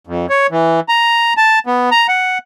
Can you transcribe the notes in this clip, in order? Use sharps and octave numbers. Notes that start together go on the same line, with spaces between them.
F2
C#5
E3
A#5
A5
B3
A#5
F#5